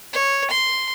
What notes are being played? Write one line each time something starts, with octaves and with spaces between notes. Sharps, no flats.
C#5
C6